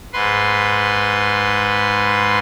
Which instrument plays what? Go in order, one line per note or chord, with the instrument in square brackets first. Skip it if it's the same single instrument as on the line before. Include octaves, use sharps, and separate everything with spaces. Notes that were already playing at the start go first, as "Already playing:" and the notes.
[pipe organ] G#2 B4 C6